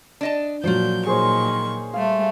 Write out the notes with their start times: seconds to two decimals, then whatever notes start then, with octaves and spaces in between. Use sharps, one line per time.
0.21 D4 D#5 A5
0.64 A#2 F3 F#3 D4 F4 G6
1.06 A#2 D#3 G#4 C5 C#5 C#6
1.94 G3 A3 F5